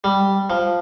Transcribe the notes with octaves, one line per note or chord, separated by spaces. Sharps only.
G3
F3